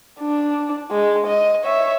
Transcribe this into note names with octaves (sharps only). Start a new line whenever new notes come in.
D4
G#3
D#5
C#5 E5